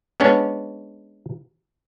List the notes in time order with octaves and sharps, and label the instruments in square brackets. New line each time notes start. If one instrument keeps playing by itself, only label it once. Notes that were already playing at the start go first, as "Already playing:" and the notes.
[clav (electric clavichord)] G#3 B3 C#4 D4 C#5